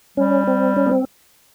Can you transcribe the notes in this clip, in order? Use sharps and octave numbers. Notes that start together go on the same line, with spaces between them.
G3 C#4
C4
C#4
B3
C4